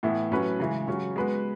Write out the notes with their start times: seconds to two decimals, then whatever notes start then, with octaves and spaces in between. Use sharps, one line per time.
0.03 A2 E3 B3 E4
0.31 A2 F#3 C#4 F#4 B4
0.60 C#3 E3 G#3
0.88 C#3 F#3 C#4
1.16 G#3 B3 F#4 B4